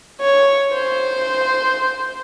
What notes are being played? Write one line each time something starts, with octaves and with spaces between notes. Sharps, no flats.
C#5
C5